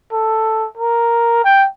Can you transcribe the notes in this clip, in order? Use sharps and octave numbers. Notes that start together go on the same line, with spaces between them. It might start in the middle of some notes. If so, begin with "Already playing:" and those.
A4
A#4
G5